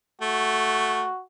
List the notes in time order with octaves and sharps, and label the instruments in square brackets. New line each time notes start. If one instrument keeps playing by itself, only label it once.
[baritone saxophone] A3 [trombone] F#4